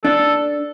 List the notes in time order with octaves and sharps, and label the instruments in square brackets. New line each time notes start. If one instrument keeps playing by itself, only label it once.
[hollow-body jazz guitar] D4 [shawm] A4